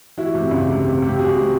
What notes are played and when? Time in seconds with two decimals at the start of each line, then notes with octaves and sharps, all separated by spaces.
0.17 E3 E4 F#4
0.34 C3
0.51 C#2
0.68 C3
0.85 C3
1.02 C3
1.08 G4
1.19 C3 F#4 G#4
1.36 C3